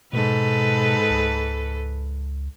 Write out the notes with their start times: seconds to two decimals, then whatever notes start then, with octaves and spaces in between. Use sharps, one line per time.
0.13 G#2 B2 A4 B4
1.10 C#2